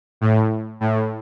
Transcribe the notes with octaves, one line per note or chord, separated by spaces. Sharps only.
A2
A2